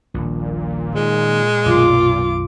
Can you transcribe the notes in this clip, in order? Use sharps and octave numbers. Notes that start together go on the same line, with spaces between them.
D#1 A#1 A#2
D#3 G#3
B1 F#2 B2 F4 D6